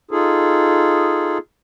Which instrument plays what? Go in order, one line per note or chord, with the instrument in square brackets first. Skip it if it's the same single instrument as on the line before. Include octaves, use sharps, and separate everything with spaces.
[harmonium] D#4 F4 G#4 A4